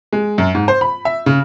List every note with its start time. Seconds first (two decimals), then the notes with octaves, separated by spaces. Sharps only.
0.13 G#3
0.38 F#2
0.55 G#2
0.68 C5
0.81 B5
1.05 E5
1.26 C#3